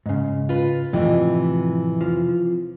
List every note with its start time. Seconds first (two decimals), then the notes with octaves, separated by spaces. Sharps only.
0.06 G#2 C#3
0.49 F4 B4
0.93 F2 A2 C3 E3
2.01 F3